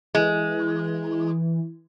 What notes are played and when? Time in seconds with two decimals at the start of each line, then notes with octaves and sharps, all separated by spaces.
0.15 E3 G#3